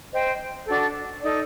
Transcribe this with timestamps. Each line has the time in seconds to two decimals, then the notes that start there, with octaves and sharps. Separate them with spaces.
0.13 C5 D#5 G5
0.66 D4 F#4 A4
1.20 D#4 A4 D5